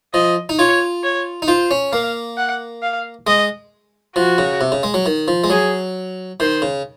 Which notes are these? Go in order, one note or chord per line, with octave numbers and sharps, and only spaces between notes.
F3 D#5
D#4
F4 C#5
C#5
D#4
F4 C5
C#4
A#3 F5
F#5
F5
G#3 D#5
F3 F#4
C#3
C3
C#3
G#3
F#3
D#3
F3
G#3
F#3 G#4
D#3 C5
C#3